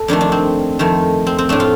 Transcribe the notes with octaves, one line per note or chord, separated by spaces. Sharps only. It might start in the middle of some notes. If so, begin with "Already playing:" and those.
Already playing: A4
F2 D#3 A3 D4
D4
C4
F2 D#3 A3
C4
C4
A2 A3 D4
F4